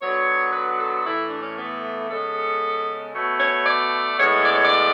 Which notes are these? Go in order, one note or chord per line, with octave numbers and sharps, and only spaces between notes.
D3 F#3 B3 C#5
B4
B4
A4
A2 E3 A3 E4
D4
C#4
B3
C#3 G#3 B3 A4
B2 A3 C#5
C#5
D5
A2 G#3 B3 C#5
D5
C#5
D5